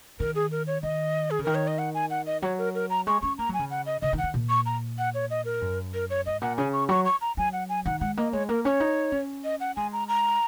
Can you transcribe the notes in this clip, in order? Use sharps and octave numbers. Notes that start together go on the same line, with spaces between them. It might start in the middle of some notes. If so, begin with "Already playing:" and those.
D#3 A#4
G#4
A#4
C#5
D#3 D#5
G#4
C#3
D#3 A#4
C#5
D#5
F#5
G#5
F#5
D#5
F#3 C#5
A#4
A#4
A#5
G#3 C#6
C#4 C#6
A#3 A#5
F#3 G#5
C#3
F#5
D#5
C#3 D#5
D#3
F#5
D#3
A#2
C#6
A#5
F#5
C#5
D#5
A#4
F#2
A#4
C#5
G#2 D#5
A#2 F#5
C#3 G#5
C#6
F#3 C#6
C#6
A#5
F#3 G#5
F#5
G#5
D#3 F#5
G#3 F#5
A#3 D#5
G#3 C#5
A#3 A#4
C#4 C#5
D#4
C#4
D#5
F#5
G#3 G#5
A#5
A#5